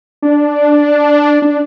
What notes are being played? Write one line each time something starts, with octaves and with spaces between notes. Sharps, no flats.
D4
D4